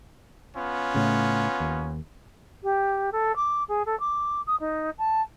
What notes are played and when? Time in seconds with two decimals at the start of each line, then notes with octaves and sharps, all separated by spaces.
0.55 B3 C#4 F4
0.94 A2 C#3
1.60 D#2
2.63 G4
3.12 A4
3.36 D6
3.68 G#4
3.86 A4
4.00 D6
4.47 D#6
4.60 D#4
4.98 A5